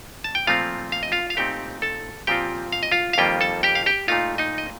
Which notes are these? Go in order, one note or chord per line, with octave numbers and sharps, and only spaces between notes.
A5
G5
A#2 F3 A3 C4 F4 F5
F5
D#5
F4 F5
F5
A#2 A3 C4 D#4 G4 G5
A4 A5
A#2 F3 C4 F4 G4 G5
F5
D#5
F4 F5
F5
F2 D#3 G3 A#3 F4 G4 G5
A4 A5
G4 G5
F5
G4 G5
A#2 A3 D#4 F4 F5
D#4 D#5
D#5